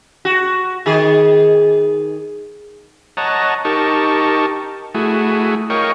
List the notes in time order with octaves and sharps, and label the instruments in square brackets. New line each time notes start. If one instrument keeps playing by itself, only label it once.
[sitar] F#4
D#3 G#4
[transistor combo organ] C#5 D#5 F#5 A5 A#5
D#4 G4 A#4 A5 C#6
A3 E4 F#4 G#4
A#4 C#5 D#5 F5 G5 C#6